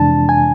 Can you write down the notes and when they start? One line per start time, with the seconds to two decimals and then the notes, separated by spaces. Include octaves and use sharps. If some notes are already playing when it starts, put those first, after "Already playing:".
Already playing: F2 C3 E3 G#3 D4 A5
0.29 G#5